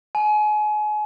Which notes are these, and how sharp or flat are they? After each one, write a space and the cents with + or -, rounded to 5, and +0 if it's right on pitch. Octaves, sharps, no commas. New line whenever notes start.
G#5 +30